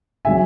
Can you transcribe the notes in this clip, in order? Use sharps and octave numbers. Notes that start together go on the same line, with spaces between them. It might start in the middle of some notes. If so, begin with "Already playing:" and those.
C#3 F#3 E5 G#5